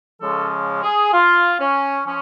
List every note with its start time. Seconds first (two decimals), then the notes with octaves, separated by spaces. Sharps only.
0.21 C#3 F3 G#3 C#4 A4
0.83 G#4
1.13 F4
1.59 C#4
2.06 F3 C#4